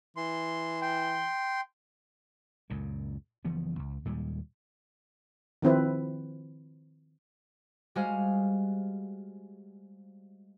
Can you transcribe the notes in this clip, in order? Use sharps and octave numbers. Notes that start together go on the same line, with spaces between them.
E3 C6
G5 C6
C#2 F#2 A#2
F#1 E3 F3 B3
C#2
D#2 A#2 G3 G#3
D#3 F3 C4 E4 B4
G3 G#3 F#4 G#4 C5 F5